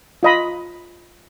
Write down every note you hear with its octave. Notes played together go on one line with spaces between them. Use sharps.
F4 D#5 B5